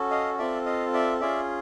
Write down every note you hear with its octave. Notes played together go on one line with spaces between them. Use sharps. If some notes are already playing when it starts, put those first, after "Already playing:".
Already playing: C#4 F#4 A4
D#5 F5
C4 F4 A4 D5 E5
D#5 F5
D5 E5
C#4 F4 G#4 D5 E5